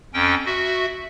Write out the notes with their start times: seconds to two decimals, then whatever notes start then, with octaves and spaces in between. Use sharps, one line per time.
0.14 F2 C#4 G5
0.46 F#4 E5